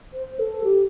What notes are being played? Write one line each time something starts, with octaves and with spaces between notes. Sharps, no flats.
C5
A4
G4